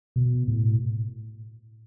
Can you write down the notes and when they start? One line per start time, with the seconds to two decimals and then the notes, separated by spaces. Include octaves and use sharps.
0.16 B2
0.48 A2